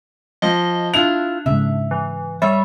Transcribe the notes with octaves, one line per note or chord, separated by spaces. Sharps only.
F3 D#5
D4 E4 F4 F7
G#2 C#3 E5
E3
G3 C#5 E5